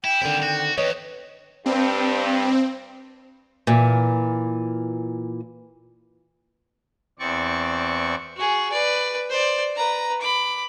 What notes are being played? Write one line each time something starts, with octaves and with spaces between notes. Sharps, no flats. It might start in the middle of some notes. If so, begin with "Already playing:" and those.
E4 G5
D3 D#3 G3 C4 E4
F#4
E2 B4 C#5 D#5
G2 C4
A#2 E3
E2 C4 D5 C#6
F#4 G#4
B4 D5
C5 D5
B4 A#5
B5 D6